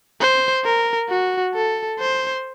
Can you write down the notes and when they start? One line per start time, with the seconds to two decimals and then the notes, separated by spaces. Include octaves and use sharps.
0.20 C5
0.64 A#4
1.09 F#4
1.54 A4
1.99 C5